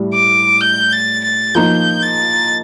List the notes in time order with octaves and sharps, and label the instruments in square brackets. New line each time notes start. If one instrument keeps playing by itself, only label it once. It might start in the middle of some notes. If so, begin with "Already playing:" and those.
Already playing: [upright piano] A2 G3
[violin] D6
G6
A6
A6
[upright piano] F3 A#3 D#4 [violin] G6
[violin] A6